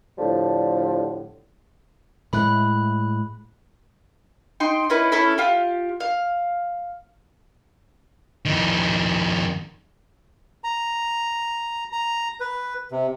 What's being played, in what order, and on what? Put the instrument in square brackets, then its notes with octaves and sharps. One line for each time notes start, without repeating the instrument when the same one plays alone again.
[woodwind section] A2 D3 F3 G3
[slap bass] A2 G#3 A3 [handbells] B5 F#6
[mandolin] D#4 G5 C6 G6
C#4 D#4 E4 B4
C#4 E4 A4 B5
F4 G4
F5
[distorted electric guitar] F2 D#3
[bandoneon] A#5
A#5
B4
C3